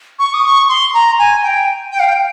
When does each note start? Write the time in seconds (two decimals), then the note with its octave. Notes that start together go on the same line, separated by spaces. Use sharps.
0.19 C#6
0.34 D#6
0.45 C#6
0.69 C6
0.94 A#5
1.19 G#5
1.43 G5
1.92 G5
2.00 F5
2.07 G5